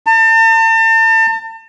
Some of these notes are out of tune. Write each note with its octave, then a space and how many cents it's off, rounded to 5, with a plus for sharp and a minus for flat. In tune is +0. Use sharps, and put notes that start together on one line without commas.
A5 +40